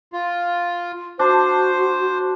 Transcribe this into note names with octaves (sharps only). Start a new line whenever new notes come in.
F4
D4 F#4 C5